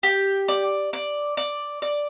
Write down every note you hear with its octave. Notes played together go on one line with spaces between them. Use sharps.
G4
D5
D5
D5
D5